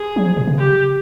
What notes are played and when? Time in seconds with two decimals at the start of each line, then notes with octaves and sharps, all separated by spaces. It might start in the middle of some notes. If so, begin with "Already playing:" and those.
Already playing: G#4
0.16 F#3
0.26 F3
0.37 B2
0.47 C#3
0.58 G4